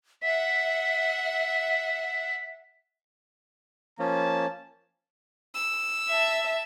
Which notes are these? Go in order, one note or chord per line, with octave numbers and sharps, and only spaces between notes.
E5 F#5 B6
F3 A#3 C#4 A5
E6
E5 A5